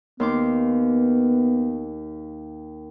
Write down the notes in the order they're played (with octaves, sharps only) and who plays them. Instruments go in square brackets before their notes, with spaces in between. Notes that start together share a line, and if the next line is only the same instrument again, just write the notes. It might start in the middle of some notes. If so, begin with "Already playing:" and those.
[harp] D#2 C6 D6 [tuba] B3